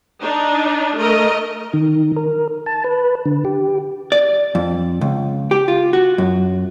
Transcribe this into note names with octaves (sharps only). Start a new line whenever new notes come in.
D4 D#4
A3 A#4 D#5
D#3
A#4
A5
B4
D3
G4
D5
F2
C#2
G4
F4
F#4
F#2